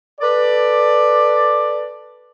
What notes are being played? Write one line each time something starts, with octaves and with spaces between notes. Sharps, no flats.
A4 B4 D5